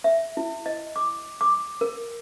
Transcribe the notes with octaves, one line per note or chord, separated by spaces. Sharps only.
E5
E4
D#5
D6
D6
A#4